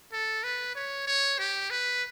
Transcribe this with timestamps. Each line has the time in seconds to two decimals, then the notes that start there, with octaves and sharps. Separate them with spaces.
0.12 A4
0.44 B4
0.76 C#5
1.07 C#5
1.39 G4
1.70 B4